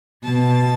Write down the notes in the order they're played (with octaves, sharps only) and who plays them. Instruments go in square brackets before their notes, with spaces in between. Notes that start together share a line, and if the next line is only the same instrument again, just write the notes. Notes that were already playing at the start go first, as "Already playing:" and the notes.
[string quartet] B2 [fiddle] A5